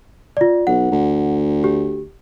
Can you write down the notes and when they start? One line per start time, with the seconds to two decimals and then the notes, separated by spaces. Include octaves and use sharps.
0.37 F4 D5
0.67 B1 F#5
0.91 D2
1.64 G4